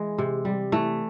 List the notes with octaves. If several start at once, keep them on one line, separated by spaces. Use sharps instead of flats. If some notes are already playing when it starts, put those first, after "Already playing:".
Already playing: E3 G#3
C3
G3
E3 A3